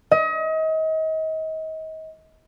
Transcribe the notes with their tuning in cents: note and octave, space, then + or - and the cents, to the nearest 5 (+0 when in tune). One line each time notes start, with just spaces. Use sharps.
D#5 +35